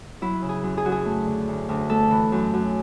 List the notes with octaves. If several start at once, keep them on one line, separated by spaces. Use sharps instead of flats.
F#3 E4
C#3
G#4
F#2
G#4
F#2 F#4
G#4
A3
D3
D2
D2
A3 A4
E3
F#2
F#2